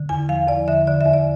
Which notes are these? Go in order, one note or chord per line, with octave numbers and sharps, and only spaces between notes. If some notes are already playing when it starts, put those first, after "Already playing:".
Already playing: D3
E2 G#5
F3 F5
E2 D5
D3 E5
D3 D5
E5
E2
D5